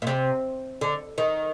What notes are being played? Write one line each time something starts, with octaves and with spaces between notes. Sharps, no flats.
A#2
C3
D3
D#3